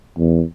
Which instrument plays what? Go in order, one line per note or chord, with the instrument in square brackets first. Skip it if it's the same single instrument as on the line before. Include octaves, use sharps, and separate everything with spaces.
[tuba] E2